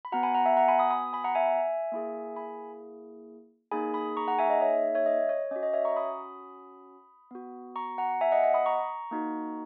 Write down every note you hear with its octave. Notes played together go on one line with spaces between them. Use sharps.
B5
B3 F#4 F#5 A#5
G#5 B5
F#5 A#5
E5 G#5
F#5 A#5
G#5 B5
B5 D#6
B5 D#6
G#5 B5
F#5 A#5
E5 G#5
A#3 E4 G#4
G#5 B5
A#3 D#4 G#4 G#5 B5
B5 D#6
A#5 C#6
F#5 A#5
E5 G#5
D#5
C#5 E5
C#5 E5
D#5
C#5
C#4 F#4 D#5
D#5
C#5 E5
A#5 C#6
B5 D#6
B3 F#4
A#5 C#6
F#5 A#5
E5 G#5
D#5 F#5
D#5 F#5
B5 D#6
A#5 C#6
A#3 D#4 F#4